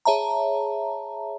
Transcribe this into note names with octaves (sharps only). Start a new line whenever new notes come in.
G#4 C#5 E5 A5 A#5